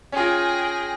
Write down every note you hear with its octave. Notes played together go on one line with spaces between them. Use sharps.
C#4 F4 G#4 G5 A#6